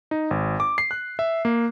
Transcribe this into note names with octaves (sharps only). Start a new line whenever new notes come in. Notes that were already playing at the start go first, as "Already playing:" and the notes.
D#4
G#1
D6
C7
F#6
E5
A#3